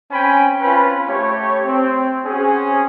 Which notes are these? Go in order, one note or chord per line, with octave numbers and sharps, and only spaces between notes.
C4 C#4 G5 G#5 B5
C4 C#4 F4 B4
A3 G4 C#5
C4
C4 C#4 F#4 G#4